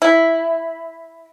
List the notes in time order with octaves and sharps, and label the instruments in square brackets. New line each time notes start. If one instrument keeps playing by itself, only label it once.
[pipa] E4